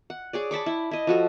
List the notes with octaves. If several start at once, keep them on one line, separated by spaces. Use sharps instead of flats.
F#5
G#4 C#5 D5
A5 B5 C#6 D6
E4
E4 D#5
F3 F#4 A4